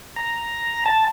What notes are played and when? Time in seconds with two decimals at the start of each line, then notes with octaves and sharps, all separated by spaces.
0.16 A#5
0.86 A5